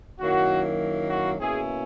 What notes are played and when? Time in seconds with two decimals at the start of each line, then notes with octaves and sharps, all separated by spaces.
0.20 F#2 D#3 F#3 A#3 E4 F#4
1.09 F#4
1.39 B2 A#3 C#4 E4 G#4